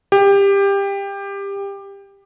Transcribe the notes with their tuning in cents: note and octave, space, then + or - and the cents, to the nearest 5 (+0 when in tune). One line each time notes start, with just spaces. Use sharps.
G4 +20